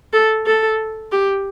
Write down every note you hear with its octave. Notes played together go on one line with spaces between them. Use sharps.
A4
A4
G4